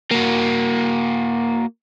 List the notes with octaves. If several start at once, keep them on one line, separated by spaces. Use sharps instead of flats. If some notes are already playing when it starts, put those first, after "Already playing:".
A#3 F#4